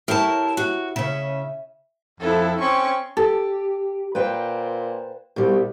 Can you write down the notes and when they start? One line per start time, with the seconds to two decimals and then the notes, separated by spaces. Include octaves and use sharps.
0.08 E4 G4 A#4 C#5 A5
0.57 F#4
0.96 C#3 C#4 E5
2.20 F2 E4 A4
2.60 C4 C#4 C#6
3.17 G4 A4
4.15 A#2 B4 C5 G5
5.36 C2 B2 G3